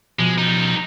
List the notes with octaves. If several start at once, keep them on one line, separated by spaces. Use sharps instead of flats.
B2 F3 G#3
G3 D#4